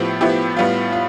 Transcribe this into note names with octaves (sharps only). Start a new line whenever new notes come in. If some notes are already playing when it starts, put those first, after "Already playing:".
Already playing: A2 F3 B3 E4 G4
A2 F3 B3 E4 G4
A2 G3 B3 F4
F4